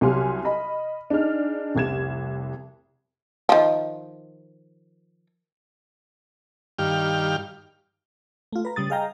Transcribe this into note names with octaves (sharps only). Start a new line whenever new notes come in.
C2 F#3 G4 G#5 C6 F6
D#5 B5
D4 D#4 G#4 F6
F1 C2 G#6 E7
D#3 F3
G2 D#3 G4 F5 G5 F6
A3 F4
B4 A#5
C#3 G3 D#6 A6
G#4 D#5 F5 G5 A#5